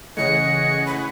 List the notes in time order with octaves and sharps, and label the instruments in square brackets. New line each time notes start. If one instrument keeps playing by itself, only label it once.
[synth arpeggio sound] C#3 E3 A3 [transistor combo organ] G#4 C#5 F#5 [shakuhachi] D#5 [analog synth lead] C#7
[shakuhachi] B5